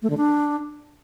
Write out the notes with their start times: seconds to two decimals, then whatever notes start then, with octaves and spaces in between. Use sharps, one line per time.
0.02 A3
0.10 D3
0.17 D4